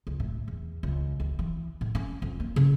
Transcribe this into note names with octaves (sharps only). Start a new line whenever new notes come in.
C#2
A2
E2
C#2
D2
E3
A2
C#4
F2
A#3
C#3